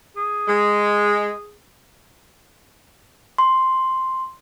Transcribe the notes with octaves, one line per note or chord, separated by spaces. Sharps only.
G#4
G#3
C6